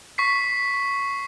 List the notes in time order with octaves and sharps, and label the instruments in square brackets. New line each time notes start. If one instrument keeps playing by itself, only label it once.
[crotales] C#6 B6 C7